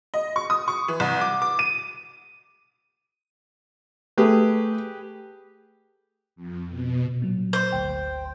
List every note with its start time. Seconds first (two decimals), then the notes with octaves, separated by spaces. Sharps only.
0.14 D#5
0.36 C#6
0.50 D#6
0.68 C#6
0.88 E3
1.00 C2
1.21 D6
1.42 D6
1.59 D#7
4.17 A3 G4 G#4 B4
6.36 F2
6.68 B2
7.22 A#2 F#3
7.53 C5
7.72 G#1 D2 G5